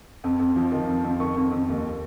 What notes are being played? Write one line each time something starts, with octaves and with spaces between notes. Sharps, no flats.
F2
F2
F3
D#3
F2
F2
D#3 C#6
F2
F2
D#2